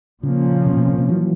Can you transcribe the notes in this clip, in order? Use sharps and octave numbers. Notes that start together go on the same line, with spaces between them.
A#2 C#3 F3 A#3 C#4
B2
B2
C3
C3
E3 F#3